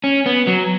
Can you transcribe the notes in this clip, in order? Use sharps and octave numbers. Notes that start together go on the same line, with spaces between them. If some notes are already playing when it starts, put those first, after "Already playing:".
C#4
B3
F#3